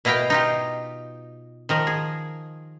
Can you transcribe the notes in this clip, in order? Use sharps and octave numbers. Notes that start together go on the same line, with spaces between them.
B2 E4 D#5 F5 G5
D#4 F4 G4
D#3 F3 A#4
G#4